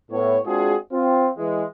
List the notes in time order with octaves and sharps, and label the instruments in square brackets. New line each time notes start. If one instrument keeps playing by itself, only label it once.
[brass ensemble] A2 B3 C#5
G#3 C4 D4 F4 F#4 G#4
C4 F4
E3 G#3